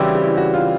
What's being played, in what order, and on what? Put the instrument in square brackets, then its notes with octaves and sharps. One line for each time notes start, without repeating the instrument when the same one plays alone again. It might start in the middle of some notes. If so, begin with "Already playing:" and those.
Already playing: [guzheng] C#3 E3 G3 C4 E4 [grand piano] F#4 G4
[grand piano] G4
F#4
F4